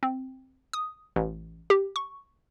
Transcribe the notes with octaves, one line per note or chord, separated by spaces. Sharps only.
C4
D#6
A1
G4
C#6